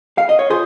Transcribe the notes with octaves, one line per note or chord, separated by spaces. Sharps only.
F5
D#5
C#5
F4 G#4 C5